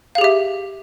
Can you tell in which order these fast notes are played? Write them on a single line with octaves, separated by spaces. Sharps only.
F5 G#4 G4 E5